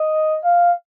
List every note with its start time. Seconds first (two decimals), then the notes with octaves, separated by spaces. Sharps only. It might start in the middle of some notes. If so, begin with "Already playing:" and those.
Already playing: D#5
0.44 F5